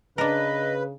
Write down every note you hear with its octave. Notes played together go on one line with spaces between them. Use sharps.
C#3 D4 A#4 B4 D#5